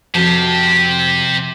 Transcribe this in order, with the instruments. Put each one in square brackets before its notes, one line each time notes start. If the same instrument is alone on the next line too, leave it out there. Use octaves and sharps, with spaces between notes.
[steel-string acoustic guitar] F2 F#4 A5 [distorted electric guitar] C3 G4